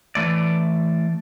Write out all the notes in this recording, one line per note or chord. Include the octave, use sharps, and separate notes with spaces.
E3 A3 D5